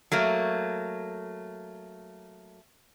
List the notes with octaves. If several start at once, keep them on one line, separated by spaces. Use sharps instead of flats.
F#3 A3 A#3